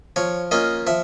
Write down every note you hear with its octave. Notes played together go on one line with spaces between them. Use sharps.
F3 C#5
A#3 C#4 F4 D#5
F3 E5